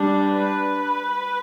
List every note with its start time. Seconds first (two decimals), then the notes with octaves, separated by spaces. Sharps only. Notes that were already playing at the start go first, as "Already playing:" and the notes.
Already playing: G3 D4
0.22 B4